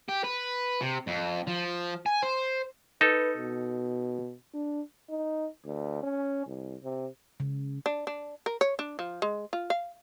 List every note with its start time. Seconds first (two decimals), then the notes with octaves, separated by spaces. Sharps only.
0.08 G4
0.24 B4
0.81 C3
1.08 F2
1.48 F3
2.06 G#5
2.22 C5
3.01 D#4 A4 B4
3.37 B2
4.54 D4
5.09 D#4
5.65 D2
6.03 C#4
6.46 C2
6.84 C3
7.40 C#3
7.86 D4
8.07 D4
8.46 A#4
8.61 C#5
8.79 D4
8.99 F3
9.22 G#3
9.53 F4
9.70 F5